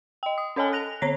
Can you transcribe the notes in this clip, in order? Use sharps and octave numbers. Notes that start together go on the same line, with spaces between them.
D#5 G5
D#6
C#4 A4 C#5 D#5 G#5 A5
F#6 A#6 F7
D3 C4 C#5 A#6 C7